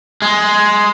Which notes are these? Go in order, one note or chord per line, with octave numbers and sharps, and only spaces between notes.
G#3